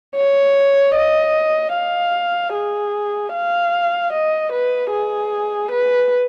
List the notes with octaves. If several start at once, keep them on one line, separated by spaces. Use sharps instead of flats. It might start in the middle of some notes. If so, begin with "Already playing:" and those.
C#5
D#5
F5
G#4
F5
D#5
B4
G#4
B4